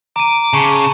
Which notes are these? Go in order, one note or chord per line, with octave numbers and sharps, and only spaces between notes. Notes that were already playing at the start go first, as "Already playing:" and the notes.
A#5 D6 D#7
C#3 A5 C#6